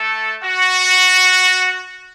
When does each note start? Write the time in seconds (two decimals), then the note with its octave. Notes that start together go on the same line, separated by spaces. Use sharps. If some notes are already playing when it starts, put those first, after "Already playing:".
Already playing: A3 A4
0.43 F#4